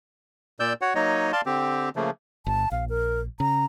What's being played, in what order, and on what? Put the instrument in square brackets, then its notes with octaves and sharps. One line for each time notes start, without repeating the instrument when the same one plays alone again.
[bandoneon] A#2 D5 E6 G6
F#4 C#5 F#5
F#3 A#3 D#4 C#5 D#5
D5 F5 A5 C6
D3 C4 G4
C#3 F3 A3 A#3
[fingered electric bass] G1 [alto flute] A5
[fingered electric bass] A#1 [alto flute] F5
[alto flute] A#4
[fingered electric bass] C#3 [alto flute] A#5